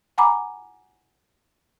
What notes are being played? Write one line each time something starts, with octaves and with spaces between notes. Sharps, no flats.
F#5 G#5 A#5 B5 D6